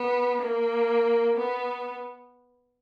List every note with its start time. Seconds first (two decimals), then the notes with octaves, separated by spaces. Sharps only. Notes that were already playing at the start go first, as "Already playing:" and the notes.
Already playing: B3
0.42 A#3
1.37 B3